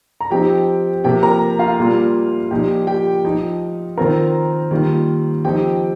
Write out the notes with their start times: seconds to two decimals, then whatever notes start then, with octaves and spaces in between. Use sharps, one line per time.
0.21 A#5
0.30 F3 C4 D#4 G4 G5
1.04 C3 F3 A#3 G4 G5
1.23 A#4 A#5
1.59 F4 F5
1.78 A#2 G3 A#3 F4
2.51 A#2 F3 D#4 G4 G5
2.87 G4 G5
3.24 F3 D#4
3.98 D#3 C4 F4 A#4 A#5
4.71 D#3 G3 A#3 F4
5.45 F3 C4 D#4 G4 G5